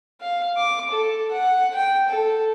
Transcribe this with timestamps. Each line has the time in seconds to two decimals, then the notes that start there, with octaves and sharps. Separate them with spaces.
0.21 F5
0.57 D6
0.91 A4
1.31 F#5
1.75 G5
2.08 A4